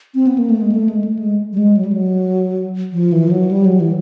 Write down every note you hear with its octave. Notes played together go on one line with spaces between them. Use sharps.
C4
B3
A#3
A3
G#3
A#3
A3
G#3
A3
G#3
G3
G#3
F#3
G3
F#3
F3
E3
F3
F#3
G3
F#3
E3